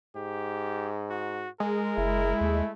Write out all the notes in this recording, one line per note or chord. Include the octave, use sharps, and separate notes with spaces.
G#2 G4
F#4
G#3 A#4
F#1 E4
D#2 A3